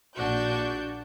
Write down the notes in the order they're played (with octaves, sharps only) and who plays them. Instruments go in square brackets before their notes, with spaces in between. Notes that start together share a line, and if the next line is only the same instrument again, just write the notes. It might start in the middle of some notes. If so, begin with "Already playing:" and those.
[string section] A#1 D4 F#4 G6